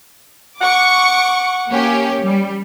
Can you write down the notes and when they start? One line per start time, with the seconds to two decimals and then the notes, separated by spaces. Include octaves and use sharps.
0.61 F#5 C#6 D6
1.70 A#3 C#4 G4
2.22 G3